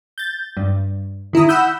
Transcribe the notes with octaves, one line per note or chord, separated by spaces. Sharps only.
G6 A6
G2
D#3 E4 A#5 D#6
F#5 B5 E6 G6